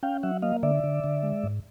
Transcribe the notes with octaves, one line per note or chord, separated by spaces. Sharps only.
C#4 F5 G5
F#3 E5 F#5
A#3 D#5 F5
D3 D5 E5
D3
D3
G#3
G#2